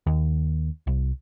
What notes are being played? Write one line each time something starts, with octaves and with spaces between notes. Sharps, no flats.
D#2
C2